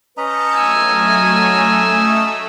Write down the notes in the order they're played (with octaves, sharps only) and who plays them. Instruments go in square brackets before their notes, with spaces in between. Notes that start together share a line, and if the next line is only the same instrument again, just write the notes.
[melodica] C#4 D#5 A#5 [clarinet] B4 [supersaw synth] A5 G6 C#7
[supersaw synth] F#3 A3 [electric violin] G#5 [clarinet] E6
[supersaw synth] A3